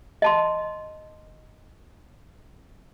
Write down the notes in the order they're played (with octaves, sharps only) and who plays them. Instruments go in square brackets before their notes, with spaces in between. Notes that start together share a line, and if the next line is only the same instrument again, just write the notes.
[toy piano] D#5 A5 C6